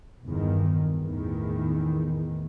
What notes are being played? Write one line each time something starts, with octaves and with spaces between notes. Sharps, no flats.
G1 E2 G2 D#3
A1 E2 D#3